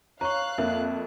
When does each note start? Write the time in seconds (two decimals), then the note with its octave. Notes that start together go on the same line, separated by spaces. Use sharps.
0.21 C#5 F5 A#5 C#6 F#6
0.58 F2 A#3 E5